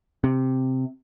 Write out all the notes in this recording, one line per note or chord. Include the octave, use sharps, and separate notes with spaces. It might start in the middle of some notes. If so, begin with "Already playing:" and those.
C3